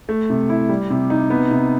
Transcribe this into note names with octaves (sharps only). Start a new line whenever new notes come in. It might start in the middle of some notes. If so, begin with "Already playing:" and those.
A3
C3
E4
G3
C3
D#4
B3
C3